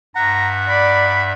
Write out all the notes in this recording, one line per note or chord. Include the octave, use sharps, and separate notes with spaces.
G2 E5 F#5 A#5
D5 B5